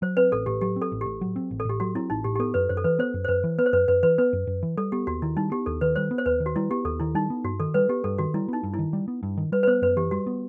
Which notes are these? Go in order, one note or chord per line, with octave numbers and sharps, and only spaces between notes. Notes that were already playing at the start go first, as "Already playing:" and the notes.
F#3 C5
C4 B4
A1 A4
A2 G4
F#3 G4
C4
A4
A1
A2 G4
F#3
C4
A1
A4
A2 G4
F#3 F#4
C4 E4
A1 D#4
A2 G4
G4
B3 A4
F#2 B4
F#2 C5
A4
E3 B4
B3 C5
F#2
C5
F#2 B4
E3
B3 B4
C5
F#2 B4
F#2 B4
E3 B4
B3 B4
F#2
F#2
E3
G3 A4
B3 G4
D#2 F#4
D#3 E4
G3 D#4
B3 G4
D#2 A4
D#3 B4
G3 C5
B3
C5
D#2 B4
D#3
F#4
G3 E4
B3 G4
D#2 A4
D#3 E4
G3 D#4
B3
G2 F#4
D#3 A4
G3 B4
B3 G4
G2 A4
D#3 F#4
G3 E4
B3 D#4
G2
D#3 E4
G3
B3
G2
D#3
G3 B4
B4
B3 C5
F#2 B4
E3 G4
G3 F#4
B3